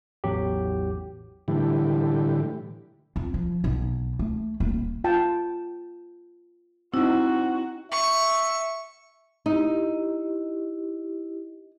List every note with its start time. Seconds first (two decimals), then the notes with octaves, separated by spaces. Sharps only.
0.24 A1 E2 F#3 G4
1.48 A2 D3 E3 G3
3.16 F2
3.34 F3
3.64 B1
4.19 A3
4.60 D#1
5.04 F4 G5 A5
6.94 C4 D#4 E4 F#4
7.92 E5 C#6
9.46 D#4 E4 G4